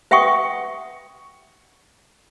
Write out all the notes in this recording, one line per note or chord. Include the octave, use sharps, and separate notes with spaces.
B4 E5 F#5 G5 C#6 D#6